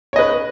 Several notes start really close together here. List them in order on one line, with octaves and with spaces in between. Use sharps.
C#5 D#5 B4